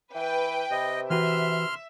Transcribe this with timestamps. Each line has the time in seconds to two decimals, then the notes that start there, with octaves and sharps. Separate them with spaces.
0.15 E3 B4 G5
0.71 C3 D#5
1.10 E3 F#4 B4 E5 C6 F6